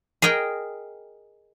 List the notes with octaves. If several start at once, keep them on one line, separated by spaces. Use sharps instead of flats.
G#4 A#4 D#5 G5